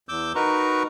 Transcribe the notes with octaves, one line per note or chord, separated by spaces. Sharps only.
E2 D6 E6 G6
D#4 F#4 A#4 B4 A#5 C#6